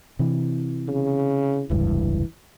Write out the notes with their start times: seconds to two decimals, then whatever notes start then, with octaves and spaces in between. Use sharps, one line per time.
0.19 C3 E3
0.88 C#3
1.70 F1 C#2 G2 E3